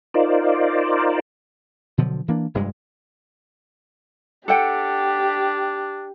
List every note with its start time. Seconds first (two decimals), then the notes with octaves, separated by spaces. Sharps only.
0.14 D#4 F4 A#4 C5 D5
1.98 B2 D3 F3 F#3
2.28 E3 A#3 D4
2.54 F1 G2 G3 G#3
4.48 D4 G4 A4 F#5 G5